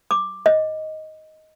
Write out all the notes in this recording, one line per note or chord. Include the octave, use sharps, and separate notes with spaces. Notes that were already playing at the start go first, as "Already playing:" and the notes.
D6
D#5